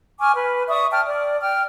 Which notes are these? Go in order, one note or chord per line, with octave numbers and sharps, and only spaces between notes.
G#5 C#6 D6 F6
B4
D5 E5 C#6 D#6
G5 A5 F6
D5
G5 F6